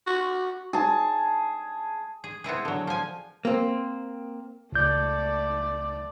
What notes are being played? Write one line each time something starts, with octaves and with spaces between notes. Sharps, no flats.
F#4
G#4 A5
G#4
B3 C4 E4 G#4
D3 F#3
F3 G#5
A#3 C4
C#2 A3 D5 G6